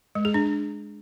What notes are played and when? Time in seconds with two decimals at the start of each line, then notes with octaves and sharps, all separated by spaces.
0.15 G#3
0.25 G#4
0.34 D4